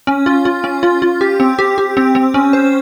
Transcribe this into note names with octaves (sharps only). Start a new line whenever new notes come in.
C#4
F4
F4
C#4
F4
F4
G4
C4
G4
G4
C4
C4
C#4
C5